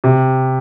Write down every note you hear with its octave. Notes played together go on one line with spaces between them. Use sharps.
C3